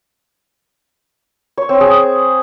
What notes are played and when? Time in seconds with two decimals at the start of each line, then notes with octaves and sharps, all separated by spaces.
1.58 C#5
1.69 C4
1.81 G#4